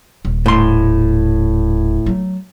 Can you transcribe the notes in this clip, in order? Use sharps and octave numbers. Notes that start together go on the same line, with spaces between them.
D#1
A2 C6
F#3 A3